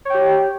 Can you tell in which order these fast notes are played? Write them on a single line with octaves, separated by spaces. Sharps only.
C#5 G5 G4